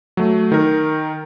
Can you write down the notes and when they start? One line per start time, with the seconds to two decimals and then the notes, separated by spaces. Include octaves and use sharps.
0.17 F#3 A3
0.52 D#3 A#4